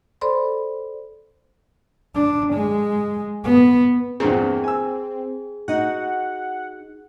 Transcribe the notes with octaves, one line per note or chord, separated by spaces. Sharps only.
A4 C5 D5 B5 C6
D4
G#3
B3
E2 G2 A#2 C4 G#4
G#5 E6
D#4 F#4 F#5